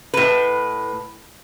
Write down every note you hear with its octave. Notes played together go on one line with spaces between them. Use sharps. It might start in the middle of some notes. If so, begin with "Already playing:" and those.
A2 B4